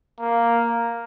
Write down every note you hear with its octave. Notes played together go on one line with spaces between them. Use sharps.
A#3